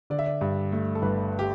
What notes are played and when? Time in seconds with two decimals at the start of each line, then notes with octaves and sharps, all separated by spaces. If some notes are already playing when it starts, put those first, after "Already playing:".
0.10 D3 D5
0.19 E5
0.26 D5
0.41 G2
0.72 A3
0.95 A4
1.02 G1 B4
1.39 G4